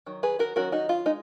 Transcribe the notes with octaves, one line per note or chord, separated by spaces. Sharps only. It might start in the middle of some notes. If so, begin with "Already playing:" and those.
D#3 F#3
G#4 B4
F#4 A#4
D#3 F#3 C#4 F#4 A#4
D#4 F#4
F4
G#3 D#4